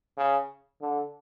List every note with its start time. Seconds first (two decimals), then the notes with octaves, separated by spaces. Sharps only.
0.18 C#3
0.82 D3